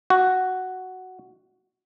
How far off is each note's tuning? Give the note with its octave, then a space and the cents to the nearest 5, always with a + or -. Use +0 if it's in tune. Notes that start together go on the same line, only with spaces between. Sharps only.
F#4 +5